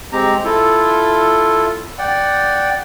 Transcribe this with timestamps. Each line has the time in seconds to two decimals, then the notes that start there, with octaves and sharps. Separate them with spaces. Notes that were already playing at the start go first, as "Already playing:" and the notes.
0.12 G#3 C4 G4 A#5
0.44 E4 F4 A4
1.98 D5 F#5 G5